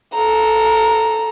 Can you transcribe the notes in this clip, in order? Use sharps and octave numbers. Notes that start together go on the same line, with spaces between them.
A4 A#5